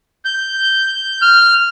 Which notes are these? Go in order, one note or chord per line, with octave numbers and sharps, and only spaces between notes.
G6
F6